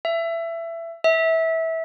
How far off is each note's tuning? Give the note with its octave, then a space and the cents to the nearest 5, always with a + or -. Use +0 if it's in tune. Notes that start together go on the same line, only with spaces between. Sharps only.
E5 +20
E5 -20